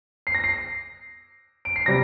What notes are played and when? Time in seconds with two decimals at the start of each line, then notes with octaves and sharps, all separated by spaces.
0.27 C7
0.35 A#6
0.44 C7
1.65 D7
1.76 C7
1.86 C3 G3 A#6